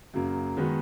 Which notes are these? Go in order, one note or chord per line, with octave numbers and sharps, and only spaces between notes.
F#2 C#3 F#3 A#3
D#3 G#3 B3 F#4 B4